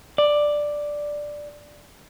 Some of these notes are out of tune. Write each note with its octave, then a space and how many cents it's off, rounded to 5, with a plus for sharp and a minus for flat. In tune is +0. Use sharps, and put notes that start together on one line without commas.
D5 +5